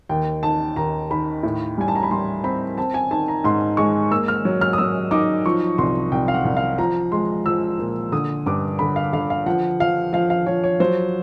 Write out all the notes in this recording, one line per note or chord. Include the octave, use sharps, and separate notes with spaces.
D#2 G5
D#3 A5
D#2 A#5
D#3 B5
A2
G3 G#5
A5
A#5
B5
G3 C6
C4 B5
C4 A5
G#5
D#3 A5
A#5
G#2 C6
G#3 C#6
A#3 E6
F6
F#3
F6
D#6
F#3 E6
D#4 D6
F3 C#6
C2 C6
C2 G5
F5
F#5
C2
F5
F3 A#5
G#3 C6
F3 E6
A#2
D3 D#6
G2 D6
D3 B5
F5
D3 F5
F5
F3 F#5
F3 F5
F3 F5
F5
F3 C#5
C#5
F#3 C5